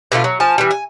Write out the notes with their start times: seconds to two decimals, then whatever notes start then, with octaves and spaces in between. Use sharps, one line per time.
0.12 B2 D3 A3 F4
0.24 F#3
0.40 F3 G#5 A5
0.58 E3 G3
0.71 G#5